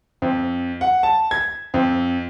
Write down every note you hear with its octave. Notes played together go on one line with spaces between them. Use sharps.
F2
F#5
A5
G#6
F2